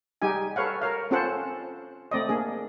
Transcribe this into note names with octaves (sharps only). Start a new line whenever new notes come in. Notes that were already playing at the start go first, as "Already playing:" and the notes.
G3 D#4 G4 G#4 G#5
A4 B4 C#5 F5 F#5
A#4 C#5 F5
C4 C#4 F4 A4 C5 F#5
A3 C4 D5 D#5
A#3 D4 G#4